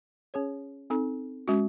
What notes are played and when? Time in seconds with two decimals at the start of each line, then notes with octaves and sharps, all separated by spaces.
0.34 C#4 G#4 C#5
0.90 C4 D#4 A4
1.48 G#3 C#4 F#4